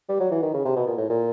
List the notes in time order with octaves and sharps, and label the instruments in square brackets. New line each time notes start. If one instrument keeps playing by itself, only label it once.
[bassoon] G3
F#3
E3
D#3
C#3
C3
B2
A#2
A2
A#2